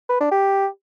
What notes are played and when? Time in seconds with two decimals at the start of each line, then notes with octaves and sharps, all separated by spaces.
0.09 B4
0.20 D4
0.32 G4